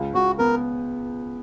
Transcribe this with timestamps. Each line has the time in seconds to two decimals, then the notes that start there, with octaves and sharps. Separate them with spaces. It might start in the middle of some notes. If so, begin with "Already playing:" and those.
Already playing: C#2
0.14 C#2 F#4
0.38 B3 A#4